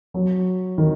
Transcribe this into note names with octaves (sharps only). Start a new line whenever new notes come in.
F#3
D#3